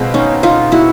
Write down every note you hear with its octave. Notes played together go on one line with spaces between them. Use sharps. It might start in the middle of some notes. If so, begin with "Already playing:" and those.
Already playing: B2 G#3 C4 F4
C#4 D#4
D#4 F4
E4 F#4